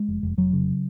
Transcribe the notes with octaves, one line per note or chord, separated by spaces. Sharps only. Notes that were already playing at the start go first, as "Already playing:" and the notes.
Already playing: G#3
F1
F1
F1 F#3
C#3